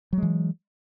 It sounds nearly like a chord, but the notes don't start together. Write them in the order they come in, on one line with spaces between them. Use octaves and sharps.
F#3 G#3 E3